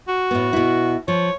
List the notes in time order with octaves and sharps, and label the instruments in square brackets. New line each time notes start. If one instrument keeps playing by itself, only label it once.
[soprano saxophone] F#4
[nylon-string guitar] A2 B3
B2 E4
[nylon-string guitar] F3 [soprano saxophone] C#5